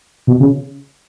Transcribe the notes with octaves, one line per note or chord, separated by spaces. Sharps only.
B2
C#3